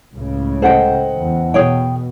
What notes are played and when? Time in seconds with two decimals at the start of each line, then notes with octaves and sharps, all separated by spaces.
0.12 C#2 A2 C#3
0.62 A4 C5 D#5 F#5 G5
1.13 E2
1.54 B2 G#4 C#5 G5